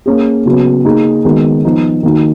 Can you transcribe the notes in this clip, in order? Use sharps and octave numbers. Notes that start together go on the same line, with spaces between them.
A#3 C#4 G#4
C#3 F#3 B3
A#3 D#4 G#4
D#3 G#3 B3 F#4
F3 B3 D#4
D#3 A#3 D#4 F#4